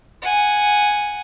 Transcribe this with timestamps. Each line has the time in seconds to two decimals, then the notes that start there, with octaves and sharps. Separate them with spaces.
0.22 F#5 G#5